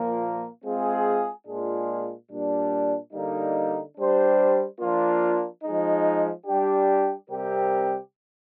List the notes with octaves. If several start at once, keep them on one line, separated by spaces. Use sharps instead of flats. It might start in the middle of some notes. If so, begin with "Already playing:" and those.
Already playing: A#2 F3 A#3
G#3 C4 F4 G#4
A#2 G#3 D4 F4 G#4
A#2 G3 D4
D3 G3 A#3 D#4
G3 D4 G4 C5
F3 A#3 D4 F4
F3 G#3 D#4
G3 D4 G4
C3 G3 C4 G4 A#4